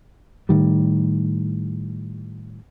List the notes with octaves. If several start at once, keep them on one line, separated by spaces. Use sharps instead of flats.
A2 D#3 G3